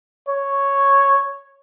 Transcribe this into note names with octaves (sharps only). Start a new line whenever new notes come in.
C#5